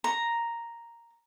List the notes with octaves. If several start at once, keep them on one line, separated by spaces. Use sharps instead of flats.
A#5